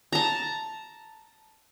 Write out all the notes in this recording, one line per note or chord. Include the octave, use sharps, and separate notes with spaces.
A5 A#5